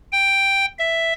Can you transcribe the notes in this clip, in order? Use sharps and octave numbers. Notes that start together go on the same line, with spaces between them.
G5
E5